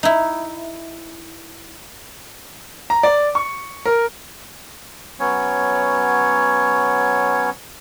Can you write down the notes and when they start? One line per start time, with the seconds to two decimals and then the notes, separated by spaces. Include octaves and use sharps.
0.03 D#4 E4
2.90 A#5
3.03 D5
3.35 C#6
3.85 A#4
5.20 F#3 B3 C#4 C#5